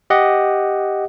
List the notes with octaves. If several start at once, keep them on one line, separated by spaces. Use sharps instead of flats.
G4 D#5 F#5